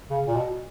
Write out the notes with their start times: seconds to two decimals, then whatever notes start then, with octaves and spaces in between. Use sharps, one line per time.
0.10 C#3
0.28 A#2
0.36 B2